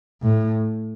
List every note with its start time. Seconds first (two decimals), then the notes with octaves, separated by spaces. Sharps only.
0.22 A2